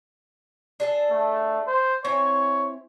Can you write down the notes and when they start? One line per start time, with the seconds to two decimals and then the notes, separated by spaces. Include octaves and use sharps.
0.80 D4 G#4 A4
1.10 A3
1.67 C5
2.05 C4 E4 C#5 G#5